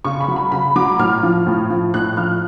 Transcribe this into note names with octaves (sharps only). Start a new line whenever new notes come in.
C#3 C#6
B5
F#3
B5
C#3 B5
F#3 D6
A2 F6
F3
A2
F3
A2 F#6
F3 F6